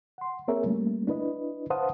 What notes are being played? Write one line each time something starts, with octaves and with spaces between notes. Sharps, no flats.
F#5 C6
A#3 C4 G#4 A#4 C#5 E5
G3 A3 A#3 C#4
D4 E4 B4 D#5
B4 C5 F5 F#5 A5 D#6